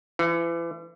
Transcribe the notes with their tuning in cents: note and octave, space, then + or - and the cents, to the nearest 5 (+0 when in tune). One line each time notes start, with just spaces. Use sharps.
E3 +35